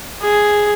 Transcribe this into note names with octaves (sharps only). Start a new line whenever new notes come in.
G#4